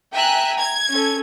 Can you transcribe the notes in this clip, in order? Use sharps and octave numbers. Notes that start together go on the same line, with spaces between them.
E5 G5 G#5 A#5 F#6
G#6
C#4 A4